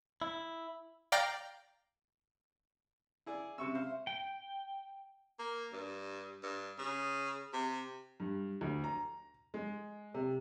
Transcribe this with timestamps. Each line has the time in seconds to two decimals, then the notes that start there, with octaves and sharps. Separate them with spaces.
0.22 E4
1.12 D5 F5 G5 A#5 G6 A#6
3.26 E4 G#4 D5
3.58 C3 C4 C#4 E5 C#6 E6
3.75 C5 E5 F5
4.07 G5
5.39 A#3
5.73 G2
6.43 G2
6.79 C#3
7.53 C3
8.20 G2
8.61 D2
8.84 A#5
9.54 G#3
10.14 C3